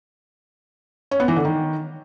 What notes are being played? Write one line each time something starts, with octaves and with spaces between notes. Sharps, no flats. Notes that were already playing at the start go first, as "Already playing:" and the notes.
C#4
B3
E3
D3
D#3